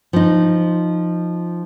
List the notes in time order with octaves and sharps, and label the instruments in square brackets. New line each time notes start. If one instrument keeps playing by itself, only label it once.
[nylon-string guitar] F3 D#4